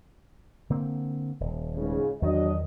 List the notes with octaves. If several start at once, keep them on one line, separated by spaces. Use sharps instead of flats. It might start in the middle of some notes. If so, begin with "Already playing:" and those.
D3 A#3 C4
D#1
C#2 G#2 C#3
E2 D#3 F#3 D4 D#5